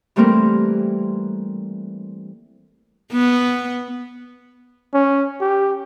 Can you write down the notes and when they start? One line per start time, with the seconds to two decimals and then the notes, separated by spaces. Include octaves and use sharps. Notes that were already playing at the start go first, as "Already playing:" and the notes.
0.16 E3 G3 A3 A#3 C4 A#4
3.13 B3
4.94 C#4
5.41 G4